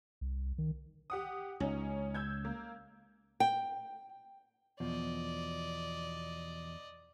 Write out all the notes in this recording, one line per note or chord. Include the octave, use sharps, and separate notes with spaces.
C2
D#3
G4 F#5 D#6
C#2 C#4 D#4
E6 G6 G#6
A#3
G5
E2 B2 F3 D5 D#5